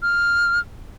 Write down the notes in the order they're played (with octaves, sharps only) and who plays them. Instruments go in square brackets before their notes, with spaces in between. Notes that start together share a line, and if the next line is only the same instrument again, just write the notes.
[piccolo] F6